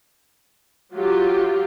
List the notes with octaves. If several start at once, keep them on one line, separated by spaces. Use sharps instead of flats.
F#3 F4 G4